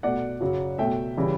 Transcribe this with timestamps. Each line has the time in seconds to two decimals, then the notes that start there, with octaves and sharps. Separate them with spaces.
0.03 B2 A3 D5 F#5
0.41 F#2 C#3 F#3
0.78 B2 A3 E5 G5
1.17 C#3 E3 G3